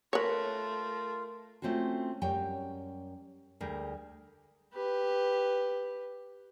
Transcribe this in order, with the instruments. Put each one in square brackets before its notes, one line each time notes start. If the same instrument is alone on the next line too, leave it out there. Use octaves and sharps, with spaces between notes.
[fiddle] A3 [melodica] F4 [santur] A#4 A#5 [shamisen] B4 C#5
[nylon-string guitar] A3 C4 C#4 F4 F#4
F#2 G3 C#5 G5
D2 G3 G#4 A#4
[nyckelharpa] G4 B4